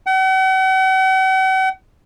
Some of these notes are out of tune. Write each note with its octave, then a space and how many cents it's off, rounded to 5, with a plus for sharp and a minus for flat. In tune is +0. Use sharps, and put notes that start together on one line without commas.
F#5 +45